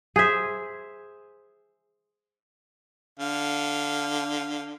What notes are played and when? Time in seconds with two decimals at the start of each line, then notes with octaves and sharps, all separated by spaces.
0.16 G#4 C5 E5
3.19 D3 F5